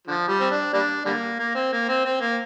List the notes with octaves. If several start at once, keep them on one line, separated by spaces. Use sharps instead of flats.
D3 F3
G3
C4
D4
G3 A#3 D4
D3 G3 A#3
A#3
C4
A#3
C4
C4
A#3